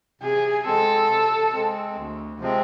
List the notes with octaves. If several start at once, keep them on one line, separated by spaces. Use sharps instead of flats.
C3 G#4
G#3 C4 A4
C3
G#3 C4
D2
C3 F3 G#3 C4